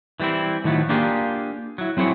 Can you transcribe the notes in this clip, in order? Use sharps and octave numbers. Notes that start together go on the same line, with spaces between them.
E3 G3 A3 C4 E4
A2 D#3 F3 F#3 A3
A#3 D4 F4 G4 G#4
F#3 E4
F#3 C4 E4 G#4 C#5